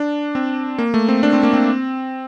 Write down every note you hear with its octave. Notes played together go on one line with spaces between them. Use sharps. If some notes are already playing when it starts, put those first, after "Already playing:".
Already playing: D4
C4
A#3
A3
C4
D4
C4
A#3
C4